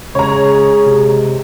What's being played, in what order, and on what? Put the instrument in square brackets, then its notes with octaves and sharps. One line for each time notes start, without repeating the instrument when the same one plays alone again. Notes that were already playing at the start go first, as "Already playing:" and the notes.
[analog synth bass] C#3 [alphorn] G#3 [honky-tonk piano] C#5 A#5
[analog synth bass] C3